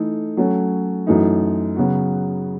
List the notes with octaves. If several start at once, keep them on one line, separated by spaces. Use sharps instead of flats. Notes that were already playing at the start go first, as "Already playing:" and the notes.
Already playing: E3 A3 D#4 A4
F#3 A3 C#4
F#2 E3 A3 D#4
C#3 F#3 B3 F#4